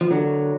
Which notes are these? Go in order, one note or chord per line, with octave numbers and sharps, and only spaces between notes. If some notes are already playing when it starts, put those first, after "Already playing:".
F3
D3 F#3